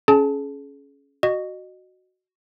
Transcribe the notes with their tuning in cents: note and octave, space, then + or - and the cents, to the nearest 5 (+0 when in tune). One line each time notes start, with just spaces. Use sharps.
C#4 +5 G#4 +35 A5 +0
F#4 +0 D#5 -25